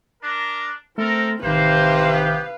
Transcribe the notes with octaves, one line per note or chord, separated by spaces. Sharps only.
D4 A#4
A3 C4 A4 A#4
A1 C3 D#3 A#3 B4 C5 F5
B3 G4